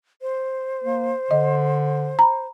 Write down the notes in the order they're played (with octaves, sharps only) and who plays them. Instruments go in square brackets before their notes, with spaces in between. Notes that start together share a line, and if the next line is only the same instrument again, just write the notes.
[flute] C5
[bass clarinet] A#3
[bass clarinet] D3 [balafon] D#5
[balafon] A#5 B5